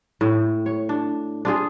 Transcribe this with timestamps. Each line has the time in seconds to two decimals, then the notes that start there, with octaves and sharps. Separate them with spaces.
0.21 A2
0.66 C#5
0.89 D4
1.45 D4 F4 G#4